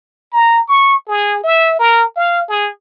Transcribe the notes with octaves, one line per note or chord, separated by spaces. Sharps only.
A#5
C#6
G#4
E5
A#4
F5
G#4